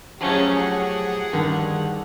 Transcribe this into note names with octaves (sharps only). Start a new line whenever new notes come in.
F3 F#3 A3 C#4 G4 G#4
F#5
G2 D3 D#3